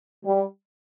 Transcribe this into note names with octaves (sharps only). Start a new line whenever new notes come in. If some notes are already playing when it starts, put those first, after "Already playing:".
G3